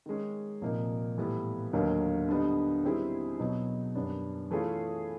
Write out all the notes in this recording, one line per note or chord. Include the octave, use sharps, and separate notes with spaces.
D#3 G#3 C#4
C2 A#2 F3 A#3 D#4
A2 E3 G3 B3
D#2 D3 F#3 A#3 D#4
D3 G3 B3 D#4
D#3 G3 C4 E4 G#4
B2 F#3 B3 D#4
F#2 D#3 G3 B3 D4
E3 A3 C#4 F4 G#4